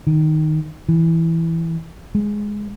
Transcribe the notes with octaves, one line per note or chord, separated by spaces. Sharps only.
D#3
E3
G#3